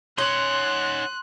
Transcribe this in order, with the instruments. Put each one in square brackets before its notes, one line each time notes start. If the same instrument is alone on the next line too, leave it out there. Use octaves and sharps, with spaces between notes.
[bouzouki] C#4 [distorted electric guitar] D#4 F#5 [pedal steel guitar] C6 [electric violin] F#6